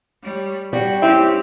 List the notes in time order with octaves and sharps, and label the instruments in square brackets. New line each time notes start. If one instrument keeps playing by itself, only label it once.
[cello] G3 C#5
[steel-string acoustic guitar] G3 [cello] F#4
[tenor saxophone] C4 [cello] C#4 G4 [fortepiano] E4